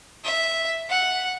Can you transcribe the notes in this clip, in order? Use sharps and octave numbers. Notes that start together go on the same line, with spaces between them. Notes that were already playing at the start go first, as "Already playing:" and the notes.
E5
F#5